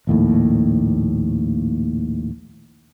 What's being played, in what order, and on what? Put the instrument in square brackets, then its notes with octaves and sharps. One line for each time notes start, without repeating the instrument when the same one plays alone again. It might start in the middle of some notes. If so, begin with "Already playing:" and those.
[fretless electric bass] A#1 D#2 A2